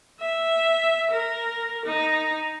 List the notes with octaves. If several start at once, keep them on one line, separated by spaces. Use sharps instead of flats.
E5
A#4
D#4